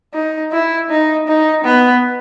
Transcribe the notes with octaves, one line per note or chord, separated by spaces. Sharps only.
D#4
E4
D#4
D#4
B3